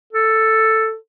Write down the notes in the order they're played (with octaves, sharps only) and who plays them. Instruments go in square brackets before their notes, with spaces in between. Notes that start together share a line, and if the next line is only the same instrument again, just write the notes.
[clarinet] A4